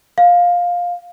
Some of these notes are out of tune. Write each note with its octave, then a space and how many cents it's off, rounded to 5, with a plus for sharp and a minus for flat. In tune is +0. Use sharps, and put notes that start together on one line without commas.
F5 +10